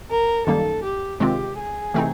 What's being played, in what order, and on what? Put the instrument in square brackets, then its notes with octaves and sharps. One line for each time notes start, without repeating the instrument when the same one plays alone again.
[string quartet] A#4
[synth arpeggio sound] F#2 D#3 G3 A#3 D#4 [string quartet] A4
[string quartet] G4
[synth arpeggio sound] C3 D#3 G#3 C4 F4 [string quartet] G4
[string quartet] G#4
[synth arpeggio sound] C3 E3 A3 C4 D#4